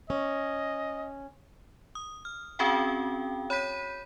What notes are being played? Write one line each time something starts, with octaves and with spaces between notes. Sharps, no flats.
C#4 D#5
D#6
F6
C4 C#4 F#4 G#4 F5 G5
C#5 B5 G6 B6 D#7